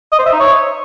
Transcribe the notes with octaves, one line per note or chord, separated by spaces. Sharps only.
D#5
C5
E5
D#4
C#5